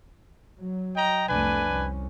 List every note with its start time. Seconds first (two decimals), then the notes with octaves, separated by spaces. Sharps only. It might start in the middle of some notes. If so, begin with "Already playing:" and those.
0.60 F#3
0.96 D#5 G5 A#5
1.28 C2 F2 A3 D4 B4 G#5
1.70 C2 C#4